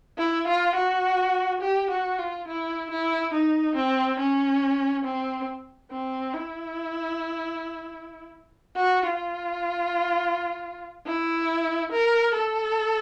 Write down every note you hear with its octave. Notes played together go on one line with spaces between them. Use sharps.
E4
F4
F#4
G4
F#4
F4
E4
E4
D#4
C4
C#4
C4
C4
E4
F#4
F4
E4
A#4
A4